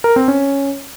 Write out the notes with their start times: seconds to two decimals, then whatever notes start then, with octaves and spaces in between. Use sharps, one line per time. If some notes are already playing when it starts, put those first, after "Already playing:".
0.04 A#4
0.16 C4
0.28 C#4